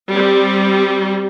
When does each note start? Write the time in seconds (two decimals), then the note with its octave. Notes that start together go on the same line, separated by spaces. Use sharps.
0.13 G3 C4